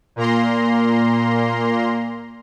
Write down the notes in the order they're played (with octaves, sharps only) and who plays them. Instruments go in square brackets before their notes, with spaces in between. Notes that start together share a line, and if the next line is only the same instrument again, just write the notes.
[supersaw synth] A#2 A#3 A#5 C6